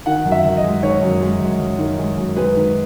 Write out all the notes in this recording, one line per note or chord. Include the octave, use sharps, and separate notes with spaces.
D#3 F#5
F#2
E5
F#2
D#5
G#3
D#3 C#5
F#2
G#3
F#2
F#2
D#3
G#3
F#2
G#3 B4
D#3